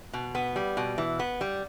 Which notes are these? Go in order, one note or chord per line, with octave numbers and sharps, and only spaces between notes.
B2
B3
G3
B2
E3
B3
G3